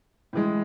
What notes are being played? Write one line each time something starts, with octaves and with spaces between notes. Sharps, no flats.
A2 E3 G#3